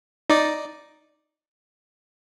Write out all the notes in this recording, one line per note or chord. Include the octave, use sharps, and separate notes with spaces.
D#4 D5